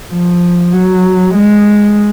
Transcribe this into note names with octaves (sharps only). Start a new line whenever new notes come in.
F3
F#3
G#3